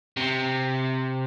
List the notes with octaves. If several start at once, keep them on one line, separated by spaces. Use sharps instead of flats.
C3